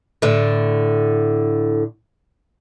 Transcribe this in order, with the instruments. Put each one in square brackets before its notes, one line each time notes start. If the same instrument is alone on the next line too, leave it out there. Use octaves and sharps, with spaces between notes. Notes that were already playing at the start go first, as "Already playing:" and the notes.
[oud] A2 D3